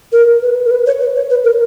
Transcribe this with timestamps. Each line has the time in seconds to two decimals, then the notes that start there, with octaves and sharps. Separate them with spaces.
0.12 A#4
0.42 B4
0.65 A#4
0.71 B4
0.87 C#5
1.01 B4
1.15 C#5
1.30 B4
1.44 A#4